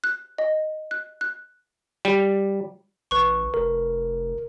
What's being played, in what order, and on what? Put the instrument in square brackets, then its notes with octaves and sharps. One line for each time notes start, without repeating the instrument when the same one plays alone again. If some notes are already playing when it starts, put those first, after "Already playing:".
[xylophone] F#6
D#5
F#6
F#6
[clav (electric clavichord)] G3
[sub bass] A1 [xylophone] B4 C#6
[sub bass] F1 [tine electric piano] A#4